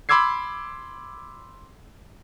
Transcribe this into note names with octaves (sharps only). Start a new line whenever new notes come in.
B5 C6 D6 E6 G#6 C7